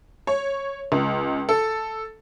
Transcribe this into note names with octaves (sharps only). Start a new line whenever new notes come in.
C#5
C#2
A4